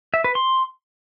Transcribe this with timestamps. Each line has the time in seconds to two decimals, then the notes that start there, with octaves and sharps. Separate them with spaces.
0.14 E5
0.24 B4
0.35 C6